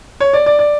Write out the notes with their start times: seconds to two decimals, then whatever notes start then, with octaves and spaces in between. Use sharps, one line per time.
0.20 C#5
0.33 D5
0.46 D5
0.59 D5